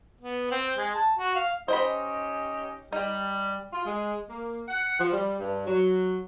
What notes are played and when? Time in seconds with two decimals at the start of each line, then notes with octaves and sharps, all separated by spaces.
0.21 B3
0.51 C4
0.78 G#3
0.94 A5
1.18 F#4
1.36 F5
1.68 C#4 D#4 G4 C5 D#5 B5
2.93 G3 D#4
3.73 F4
3.86 G#3
4.28 A#3
4.68 F#5
4.99 F3
5.13 G3
5.40 G2
5.67 F#3